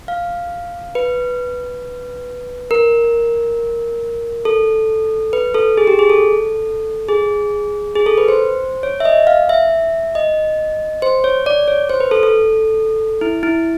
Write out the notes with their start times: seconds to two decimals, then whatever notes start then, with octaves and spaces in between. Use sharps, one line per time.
0.08 F5
0.95 B4
2.71 A#4
4.45 A4
5.33 B4
5.54 A4
5.77 G#4
5.87 G4
5.99 G#4
6.10 A4
7.08 G#4
7.95 G#4
8.06 A4
8.18 B4
8.28 C5
8.83 C#5
9.00 E5
9.05 D#5
9.27 F5
9.49 E5
10.15 D#5
11.02 C5
11.24 C#5
11.46 D5
11.68 C#5
11.90 C5
12.00 B4
12.11 A4
12.23 A4
13.21 E4
13.43 E4